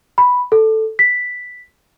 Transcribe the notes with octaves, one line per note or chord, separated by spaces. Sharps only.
B5
A4
B6